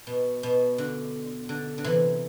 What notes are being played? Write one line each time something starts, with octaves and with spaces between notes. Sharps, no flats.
B2
B2
D3
D3
D3
C3 E3